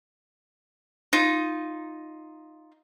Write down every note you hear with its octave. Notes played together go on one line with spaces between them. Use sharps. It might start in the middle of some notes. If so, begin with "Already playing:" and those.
D#4 F4